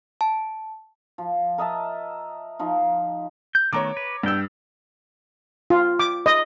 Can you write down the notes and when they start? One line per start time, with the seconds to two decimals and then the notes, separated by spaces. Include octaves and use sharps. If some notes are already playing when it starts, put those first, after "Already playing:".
0.21 A5
1.18 F3
1.58 A#4 D#5 E5 A5
2.59 F3 D#4
3.55 G6
3.73 D#3 A3 B3 C#5 A#5 D6
3.97 B4
4.23 G2 B3 G5 E6
5.70 F4
5.99 D6
6.26 D#5